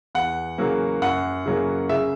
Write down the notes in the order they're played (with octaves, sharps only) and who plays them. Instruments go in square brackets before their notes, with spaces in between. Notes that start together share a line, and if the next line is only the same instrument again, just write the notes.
[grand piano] E2 F#5
C#3 F#3 A#3
F#2 F#5
C#3 F#3 A#3
C#3 E5